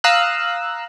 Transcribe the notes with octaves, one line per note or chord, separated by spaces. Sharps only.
F5 A#5 D#6 E6 F#6